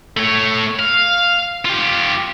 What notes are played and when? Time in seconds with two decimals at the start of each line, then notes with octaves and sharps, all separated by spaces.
0.17 A3 C#5
0.80 F5
1.66 F4 G4